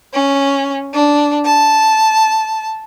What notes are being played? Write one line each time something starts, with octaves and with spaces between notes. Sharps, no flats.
C#4
D4
A5